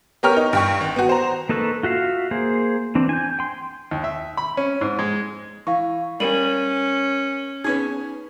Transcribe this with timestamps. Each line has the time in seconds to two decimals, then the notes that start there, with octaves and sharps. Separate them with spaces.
0.23 B3 G4 A#4 C#5 F6
0.37 D#4
0.53 G2 G5 C#6
0.80 G#1
0.96 B3 F#4
1.09 C5 A#5
1.49 A#3 D#4 A4 B4 C#6
1.83 F4 F#4 E5 F5
2.31 A#3 G#4 C5
2.95 E3 C4 D4
3.09 G#5 G6
3.39 G5 C6
3.91 D#2
4.04 E5
4.37 B5
4.57 C#4
4.81 G#2
4.99 G#3
5.67 E3 F5 C#6
6.20 G3 C#4 A#4 D#7 F#7
7.64 B3 C#4 D#4 G#4 G#6